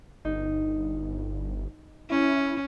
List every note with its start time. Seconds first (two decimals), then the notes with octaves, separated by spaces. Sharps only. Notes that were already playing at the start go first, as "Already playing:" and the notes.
0.25 G1 D#4
2.10 C#4 E4